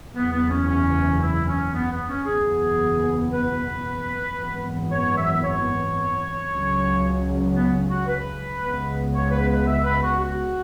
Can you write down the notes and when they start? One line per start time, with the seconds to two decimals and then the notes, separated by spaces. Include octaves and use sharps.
0.14 F#1 E2 E3 B3
0.32 B3
0.50 C#4
0.67 C#4
1.20 E4
1.46 C#4
1.73 B3
1.90 B3
2.08 C#4
2.25 F#1 E2 B2 B3 G#4
3.31 B4
4.37 G#1 F#2 E3 B3
4.90 C#5
5.16 E5
5.43 C#5
6.48 C#2 C#3 F#3 C#4
7.54 B3
7.89 F#4
8.07 B4
8.59 C#2 C#3 G#3 B3
9.13 C#5
9.31 B4
9.47 B4
9.65 E5
9.83 B4
10.01 F#4
10.18 F#4